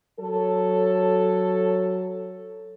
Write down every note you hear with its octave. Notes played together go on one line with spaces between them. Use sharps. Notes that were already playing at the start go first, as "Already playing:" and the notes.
F#3 A4